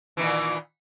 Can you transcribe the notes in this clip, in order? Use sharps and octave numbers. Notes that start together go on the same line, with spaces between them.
A#2 D#3 E3